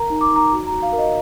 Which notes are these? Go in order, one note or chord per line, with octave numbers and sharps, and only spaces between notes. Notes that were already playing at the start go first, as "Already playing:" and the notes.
Already playing: A#4 A#5
D#4
D6
D#4
A#5
F#4
F#4 A#5
F5
A#4
D#5